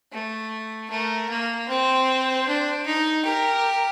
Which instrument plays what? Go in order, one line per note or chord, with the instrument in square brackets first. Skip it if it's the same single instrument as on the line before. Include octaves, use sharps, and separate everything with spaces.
[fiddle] A3
[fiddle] A3 [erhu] A#4
[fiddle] A#3
[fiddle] C4 [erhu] C5
[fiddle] D4
D#4
[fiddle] G4 [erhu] A#4